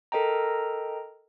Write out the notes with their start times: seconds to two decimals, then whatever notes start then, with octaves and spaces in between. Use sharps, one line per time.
0.12 A4 A#4 D#5 G5 A#5